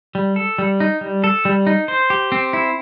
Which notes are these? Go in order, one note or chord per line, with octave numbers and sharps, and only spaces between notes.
G3
A4
G3
D#4
G3
A4
G3
D#4
C5
G4
C4
E4